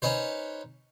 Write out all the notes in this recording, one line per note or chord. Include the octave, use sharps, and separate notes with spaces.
C#4 D#4 B4 C5